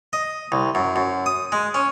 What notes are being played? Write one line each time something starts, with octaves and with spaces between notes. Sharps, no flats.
D#5
C2
F#2
F#2
D#6
G#3
C#4